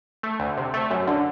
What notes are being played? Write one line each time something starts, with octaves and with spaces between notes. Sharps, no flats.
A3
D2
C3
A3
F#2
D3